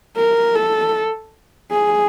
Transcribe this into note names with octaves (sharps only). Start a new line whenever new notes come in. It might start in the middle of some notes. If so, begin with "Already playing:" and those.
A#4
A4
G#4